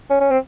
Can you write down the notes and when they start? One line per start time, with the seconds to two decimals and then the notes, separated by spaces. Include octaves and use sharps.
0.10 C#4
0.21 C#4
0.31 C4